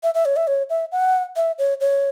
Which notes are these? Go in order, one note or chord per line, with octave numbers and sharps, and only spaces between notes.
E5
E5
C#5
E5
C#5
E5
F#5
E5
C#5
C#5